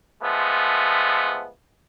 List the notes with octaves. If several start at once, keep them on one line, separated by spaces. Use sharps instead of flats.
F3 G#3 A3 B3